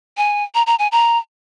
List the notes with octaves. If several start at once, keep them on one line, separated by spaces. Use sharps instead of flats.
G#5
A#5
A#5
G#5
A#5